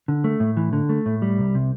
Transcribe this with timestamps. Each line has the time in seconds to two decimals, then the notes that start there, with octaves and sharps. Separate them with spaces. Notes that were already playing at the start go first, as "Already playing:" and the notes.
0.08 D3
0.24 A3
0.40 A2
0.57 E3
0.73 D3
0.89 A3
1.06 A2
1.22 G3
1.39 C2
1.55 C3